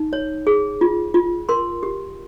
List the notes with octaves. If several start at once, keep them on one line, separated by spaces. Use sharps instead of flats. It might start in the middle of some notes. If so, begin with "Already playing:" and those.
Already playing: D#4
C#5
G#4
F4
F4
A#4 C6
G4